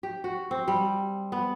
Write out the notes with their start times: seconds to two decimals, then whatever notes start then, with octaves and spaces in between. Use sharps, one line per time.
0.03 G4
0.24 F#4
0.51 C4
0.68 G3
1.32 B3